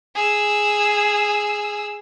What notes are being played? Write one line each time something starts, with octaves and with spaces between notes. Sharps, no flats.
G#4 E6